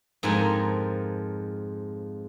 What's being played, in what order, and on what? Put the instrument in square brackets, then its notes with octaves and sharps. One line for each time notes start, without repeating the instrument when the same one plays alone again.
[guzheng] F2 G#2 F3 A#4 G#5